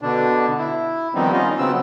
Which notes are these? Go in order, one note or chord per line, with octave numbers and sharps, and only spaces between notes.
B2 D3 D4
E4
D#3 F3 G3 B3 C4 D#4
C#4 D#4 F4 D#5
C#3 F#3 B3 C4 E6